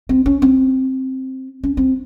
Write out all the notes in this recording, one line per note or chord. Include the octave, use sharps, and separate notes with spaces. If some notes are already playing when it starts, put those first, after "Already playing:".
C4
C#4
C4
C#4
C4